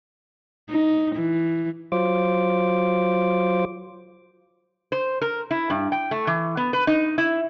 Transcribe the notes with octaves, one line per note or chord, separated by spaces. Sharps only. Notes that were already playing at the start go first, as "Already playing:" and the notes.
D#4
E3
F#3 F4 C5 D6
C5
A#4
E4
G2
G5
A3
E3
B3
B4
D#4
E4